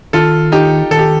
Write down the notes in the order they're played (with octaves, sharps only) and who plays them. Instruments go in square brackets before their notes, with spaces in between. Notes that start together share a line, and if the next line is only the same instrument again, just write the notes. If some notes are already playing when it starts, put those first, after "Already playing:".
[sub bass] D#3 [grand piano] F4 A4
[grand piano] D#4 G4
[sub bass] D#3 [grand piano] A4
[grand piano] G4